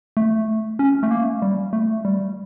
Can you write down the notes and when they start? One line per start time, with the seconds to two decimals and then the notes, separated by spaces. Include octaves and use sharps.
0.17 A3
0.79 C#4
1.03 A3
1.11 A#3
1.42 G3
1.73 A3
2.05 G3